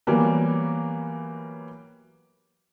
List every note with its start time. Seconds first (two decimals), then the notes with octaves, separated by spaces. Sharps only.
0.07 E3 F#3 G3 A#3 B3 A#4